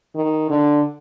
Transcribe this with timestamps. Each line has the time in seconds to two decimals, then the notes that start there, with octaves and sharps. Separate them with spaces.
0.15 D#3
0.50 D3